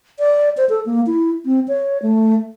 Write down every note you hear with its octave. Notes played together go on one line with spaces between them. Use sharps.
D5
C5
A4
A#3
E4
C4
C#5
A3